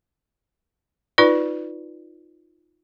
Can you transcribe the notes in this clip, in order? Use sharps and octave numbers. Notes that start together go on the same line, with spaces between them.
D#4 F4 B4 D5